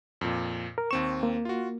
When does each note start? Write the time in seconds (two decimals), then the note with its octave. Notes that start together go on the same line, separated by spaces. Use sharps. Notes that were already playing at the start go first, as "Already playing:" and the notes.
0.21 F2 A#2
0.78 A#4
0.91 D#2 C4 C#6 E7
1.23 A#3
1.45 F4 F#4